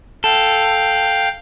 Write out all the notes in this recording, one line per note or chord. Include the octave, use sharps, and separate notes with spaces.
A4 F5 G5